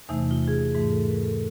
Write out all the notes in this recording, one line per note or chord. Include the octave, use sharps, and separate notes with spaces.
E2 C3 E3 A3 D#4
F4
G#4
G4
G#2 E3 A3 G#4
A4
A#4
A4